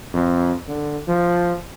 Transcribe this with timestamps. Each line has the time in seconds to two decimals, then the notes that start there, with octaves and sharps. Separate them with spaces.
0.14 F2
0.68 D3
1.07 F3